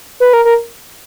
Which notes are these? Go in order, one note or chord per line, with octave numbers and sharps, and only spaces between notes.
B4
A#4
A#4